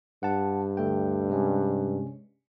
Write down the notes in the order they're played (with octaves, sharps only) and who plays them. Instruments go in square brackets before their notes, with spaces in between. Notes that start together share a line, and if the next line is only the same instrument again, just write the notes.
[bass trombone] G2 [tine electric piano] F#5 A5
[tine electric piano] D2 A3 G5
C3 G#3 C#4